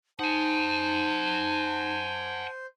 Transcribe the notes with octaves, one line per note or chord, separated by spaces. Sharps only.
D#4 C5 F#5 G#5 A5